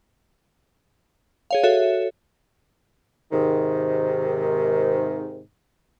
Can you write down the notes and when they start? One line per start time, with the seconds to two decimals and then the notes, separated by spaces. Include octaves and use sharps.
1.51 G#4 C#5 F5
1.63 F#4 A4 C#5 E5
3.32 G#2 C3 D#3